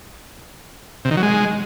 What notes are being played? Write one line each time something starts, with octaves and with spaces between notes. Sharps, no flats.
C3
D#3
F#3
G#3